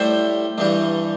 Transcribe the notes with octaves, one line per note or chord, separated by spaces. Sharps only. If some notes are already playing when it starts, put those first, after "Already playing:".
Already playing: A2 G3 C5 E5
G2 E3 G3